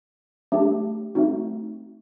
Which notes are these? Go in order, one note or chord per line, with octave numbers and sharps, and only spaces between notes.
A3 D4 G4
A3 C4 D#4 F#4